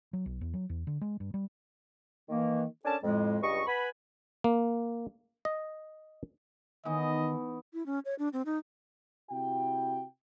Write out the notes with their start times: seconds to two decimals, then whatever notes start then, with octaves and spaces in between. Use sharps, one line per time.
0.13 F#3
0.26 B1
0.41 E2
0.53 F#3
0.69 E2
0.87 D3
1.01 G#3
1.20 G2
1.34 G3
2.29 D#3 E3 A#3
2.85 C#4 D4 A4 A#4 G#5 A5
3.03 F2 A2 G#3
3.42 C#2 G2 D#5 C#6
3.67 B4 F#5 G#5 B5
4.44 A#3
5.45 D#5
6.85 D#3 E3 B3 D#4 D#5
7.74 E4
7.86 C#4
8.05 C#5
8.19 D4
8.33 C4
8.46 D#4
9.30 C3 E4 F#4 G5